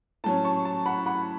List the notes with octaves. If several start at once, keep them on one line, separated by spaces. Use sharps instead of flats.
A2 F#3 C#4 A5
A5 C#6
A5
F#5 B5
F#5 B5